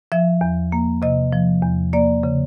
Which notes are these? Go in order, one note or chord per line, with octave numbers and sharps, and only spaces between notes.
F3 E5
E2
A#3
C3 D#5
F3
E2
A#3 D5
C#3